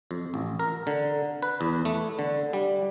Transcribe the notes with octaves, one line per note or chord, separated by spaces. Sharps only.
F2
A1
A#4
D3
B4
E2
A3
D3
G3